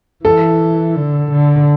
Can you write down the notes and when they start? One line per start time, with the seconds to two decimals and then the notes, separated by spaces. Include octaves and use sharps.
0.25 E3 A4
0.96 D3
1.32 D3